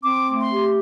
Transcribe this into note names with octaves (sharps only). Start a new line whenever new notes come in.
C4 D6
A3
C6
G4